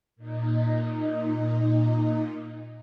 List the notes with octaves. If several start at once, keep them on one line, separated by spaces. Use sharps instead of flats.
A#2 D#4